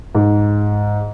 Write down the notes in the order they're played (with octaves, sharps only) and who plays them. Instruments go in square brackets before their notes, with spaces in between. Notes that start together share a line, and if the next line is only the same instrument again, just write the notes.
[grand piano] G#2